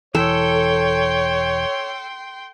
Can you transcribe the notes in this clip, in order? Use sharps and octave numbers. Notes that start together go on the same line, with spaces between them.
E1 E3 A4 C#5 G5 C6